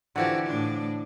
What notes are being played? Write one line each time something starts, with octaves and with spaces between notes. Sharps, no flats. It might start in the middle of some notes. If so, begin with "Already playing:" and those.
D3 E3 F3 F#4 G4
A2 D4